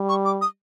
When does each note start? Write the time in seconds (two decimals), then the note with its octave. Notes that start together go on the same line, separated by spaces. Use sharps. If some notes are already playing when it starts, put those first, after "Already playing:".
Already playing: G3
0.09 C#6
0.25 D6
0.41 D#6